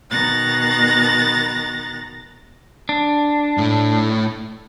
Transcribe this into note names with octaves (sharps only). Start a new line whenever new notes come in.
B2 D#3 A#5 F#6 A6 A#6
D4
A2 A3